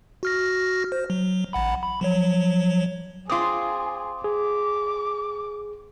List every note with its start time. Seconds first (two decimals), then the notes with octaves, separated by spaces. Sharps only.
0.23 F#4 F6 A#6
0.92 C5
1.10 F#3
1.53 A1 F#5 B5
1.83 B5
2.01 F3 F#3 C#5
3.30 C4 F4 G#4 C6 D6 D#6
4.24 G#4 D6